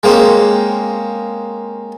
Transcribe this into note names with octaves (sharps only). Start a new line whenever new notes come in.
G#3 A#3 C4 C#4